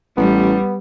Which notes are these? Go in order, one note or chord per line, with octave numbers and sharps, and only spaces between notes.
A1 G3 B3